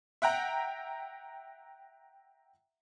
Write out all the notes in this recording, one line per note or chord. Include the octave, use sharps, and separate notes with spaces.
E5 F#5 G5 A#5